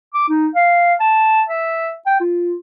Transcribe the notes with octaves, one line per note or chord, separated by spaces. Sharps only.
D6
D#4
F5
A5
E5
G5
F4